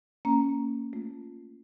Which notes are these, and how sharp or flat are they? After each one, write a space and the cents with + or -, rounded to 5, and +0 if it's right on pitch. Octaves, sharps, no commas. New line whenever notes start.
A#3 -10 C#4 +0 A#5 +0
A3 -5 F4 +0